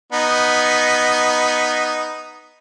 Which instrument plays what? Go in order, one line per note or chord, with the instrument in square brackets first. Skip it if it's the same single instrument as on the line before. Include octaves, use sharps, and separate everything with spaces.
[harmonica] B3 D#4